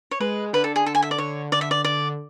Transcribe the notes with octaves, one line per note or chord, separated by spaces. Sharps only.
C#5
G#3 B4
D3 B4
A4
G#4
D3 A4
G#5
E5
D5
D3 C#5
D3 D5
E5
D5
D3 D5